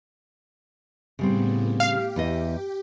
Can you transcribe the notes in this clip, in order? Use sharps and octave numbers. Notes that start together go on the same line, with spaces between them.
A2 C#3 G3 B3 C4
G4 F5
E2 E4 D#5